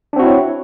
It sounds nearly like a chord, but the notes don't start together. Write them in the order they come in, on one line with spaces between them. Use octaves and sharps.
D4 C4 F#4 E4 C#5